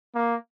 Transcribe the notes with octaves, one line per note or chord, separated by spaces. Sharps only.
A#3